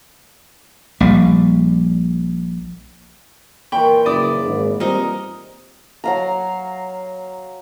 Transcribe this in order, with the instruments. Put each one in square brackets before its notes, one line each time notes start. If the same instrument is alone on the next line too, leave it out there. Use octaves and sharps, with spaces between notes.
[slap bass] A#1 G3
[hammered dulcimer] A#2 E3 [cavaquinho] G5 B5 C#6
[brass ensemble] F#1 [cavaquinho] E4 D5 D#6
[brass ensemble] G#1
[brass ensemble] G3 C4 F4 [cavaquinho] D#4 A#4 D#5
[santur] F#3 F5 A#5